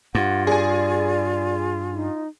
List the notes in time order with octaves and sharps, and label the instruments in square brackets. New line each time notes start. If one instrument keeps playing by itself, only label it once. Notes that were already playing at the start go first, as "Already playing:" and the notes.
[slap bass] G2 [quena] F4 [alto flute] F#5
[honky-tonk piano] G#4 G#5 [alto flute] D5
[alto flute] D#4